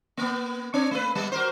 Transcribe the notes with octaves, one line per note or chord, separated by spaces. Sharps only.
A#3 B3
C4 D4 C#5
A3 B4
G3 B3
F#4 A#4 C5